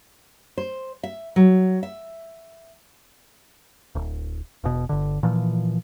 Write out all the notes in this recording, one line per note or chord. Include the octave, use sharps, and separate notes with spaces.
C5
E5
F#3
E5
D1
E1 B2
G1 D3
A#2 E3 F3